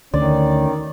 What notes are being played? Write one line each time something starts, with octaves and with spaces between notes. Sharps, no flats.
D2 D3 D#3 C#4 D5